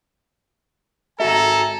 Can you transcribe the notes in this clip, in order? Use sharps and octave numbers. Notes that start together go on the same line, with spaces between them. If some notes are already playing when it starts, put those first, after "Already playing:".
G#1 F#4 A4 E5 G#5 A#5